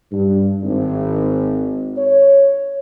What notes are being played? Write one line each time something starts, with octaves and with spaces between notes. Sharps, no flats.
G2
G#1
C#5